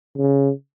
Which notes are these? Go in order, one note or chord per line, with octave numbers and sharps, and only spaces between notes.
C#3